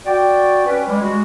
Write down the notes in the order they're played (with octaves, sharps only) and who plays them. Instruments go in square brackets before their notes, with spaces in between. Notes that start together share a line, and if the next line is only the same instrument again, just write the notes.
[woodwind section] F#4 D5 G5
C#4 B4
G3 G#3
G#3 F#4